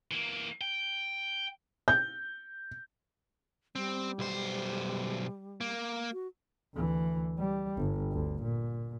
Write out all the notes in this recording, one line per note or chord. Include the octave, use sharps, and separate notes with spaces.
E3 A#3
G5
G6
G3 C4
B1 C5
A#3
F#4
D2 E3
G3
G1
D2
A#2